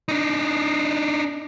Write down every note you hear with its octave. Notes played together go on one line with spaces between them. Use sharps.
D4 D#4